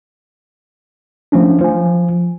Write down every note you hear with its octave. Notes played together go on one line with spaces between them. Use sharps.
F3 A3 C#4 D4
F3 G#5